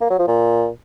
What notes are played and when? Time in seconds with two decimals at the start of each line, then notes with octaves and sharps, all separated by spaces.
0.01 A#3
0.10 F#3
0.19 F3
0.27 A#2